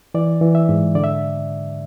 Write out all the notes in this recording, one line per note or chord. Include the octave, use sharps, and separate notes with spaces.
E3 D5
E3
E5
G#2
D3 D5
E5